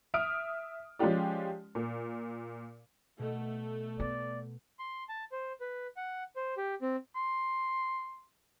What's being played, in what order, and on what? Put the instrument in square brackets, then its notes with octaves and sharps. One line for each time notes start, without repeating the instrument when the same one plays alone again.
[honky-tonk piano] E5 D#6 F6 D7
F3 G#3 C#4 F4 G4 D5
A#2
[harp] B2 [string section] A3
[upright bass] B3 [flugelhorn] D5
[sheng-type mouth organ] C6
A5
C5
B4
F#5
C5
G4
C4
[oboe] C6